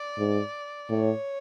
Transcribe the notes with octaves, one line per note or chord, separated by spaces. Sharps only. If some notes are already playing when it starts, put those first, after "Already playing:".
Already playing: D5
G#2
A2 C#5